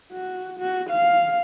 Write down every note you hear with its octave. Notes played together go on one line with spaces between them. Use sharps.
F#4
F#4
F5